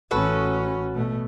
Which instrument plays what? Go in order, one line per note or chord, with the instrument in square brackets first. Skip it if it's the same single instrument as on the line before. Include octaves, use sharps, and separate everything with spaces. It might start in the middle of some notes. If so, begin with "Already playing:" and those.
[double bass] A1 C#4 [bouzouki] F#4 A4 B4
[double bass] B2 A3